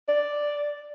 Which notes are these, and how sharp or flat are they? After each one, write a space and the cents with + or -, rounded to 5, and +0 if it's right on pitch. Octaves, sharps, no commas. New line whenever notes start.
D5 +0